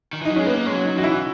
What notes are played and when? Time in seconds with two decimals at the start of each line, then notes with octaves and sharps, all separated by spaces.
0.13 D#3
0.22 E3
0.25 F#3 D#4
0.36 G#3 C#4
0.46 A#3 B3
0.66 G#3 C#4
0.73 F#3
0.85 D#4
0.97 E3 F#4
1.04 E4